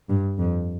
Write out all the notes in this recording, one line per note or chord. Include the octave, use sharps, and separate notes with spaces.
G2
F2